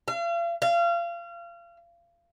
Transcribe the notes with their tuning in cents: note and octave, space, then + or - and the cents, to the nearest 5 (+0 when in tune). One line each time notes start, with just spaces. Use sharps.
F5 -40
F5 -30